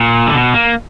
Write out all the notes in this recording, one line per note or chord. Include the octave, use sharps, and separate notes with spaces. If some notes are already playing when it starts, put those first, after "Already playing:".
Already playing: A#2
D3
B2
A#3